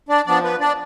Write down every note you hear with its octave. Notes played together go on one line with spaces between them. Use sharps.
D4 D5
F3 B3 D4 D5
B3 B4
D4 D5